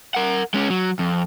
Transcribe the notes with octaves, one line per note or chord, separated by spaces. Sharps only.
A#4 F#5
G#3 C#4
F#3
F2